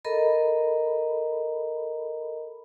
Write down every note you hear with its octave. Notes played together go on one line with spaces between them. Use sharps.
A4 A#4 D#5 A#5 B5